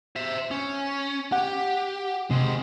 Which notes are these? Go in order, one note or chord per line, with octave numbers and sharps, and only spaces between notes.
C5 E5
C#4
G4 F#5
C3 G#3 C4